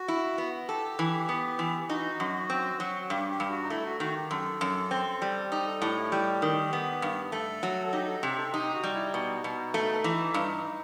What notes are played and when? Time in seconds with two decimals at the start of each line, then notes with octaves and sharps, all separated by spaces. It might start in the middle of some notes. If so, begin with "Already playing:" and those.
Already playing: F#4
0.08 E4
0.38 B3
0.68 G4 A4
0.99 E3
1.29 B3
1.59 E3
1.90 D#4 F#4
2.20 F#2
2.50 C4
2.80 F#3
3.10 G2 G4
3.30 G4
3.40 G2
3.50 F#4
3.63 D#4
3.70 A3 E4
3.85 F#4
4.00 D#3 F#4
4.16 G4
4.31 F#2 A4
4.61 F#2
4.91 C4
5.22 G3
5.52 D#4 G4
5.66 A4
5.81 A2 G4
5.97 E4
6.12 G3 G4
6.42 D#3
6.73 B3
7.02 G2
7.32 A3 A4
7.63 F#3
7.87 A4
7.93 D#4 G4
8.08 A4
8.23 C3 G4
8.38 A4
8.54 D#4 G4
8.73 F#4
8.83 G3
8.94 E4
9.14 B2 D#4
9.44 B2
9.74 A3
10.04 E3
10.34 G2